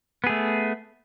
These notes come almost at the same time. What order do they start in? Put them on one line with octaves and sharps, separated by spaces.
B3 G#4 A3